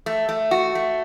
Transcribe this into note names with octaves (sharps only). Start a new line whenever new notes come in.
A3
A3
F#4
A3